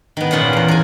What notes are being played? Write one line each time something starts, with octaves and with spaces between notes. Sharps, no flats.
D#3 B3
A#2 C#4 F4 G#4 F#5
E2 A#4
A#4 G#5